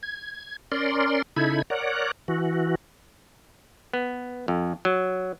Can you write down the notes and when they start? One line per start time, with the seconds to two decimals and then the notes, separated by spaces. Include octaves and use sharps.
0.03 G#6
0.72 C#4 A#4 D5 C6
1.36 C#3 D#4 E4 A4 B5 G#6
1.70 A#4 C#5 D5 F#5
2.28 E3 F#4
3.94 B3
4.48 F2
4.85 F#3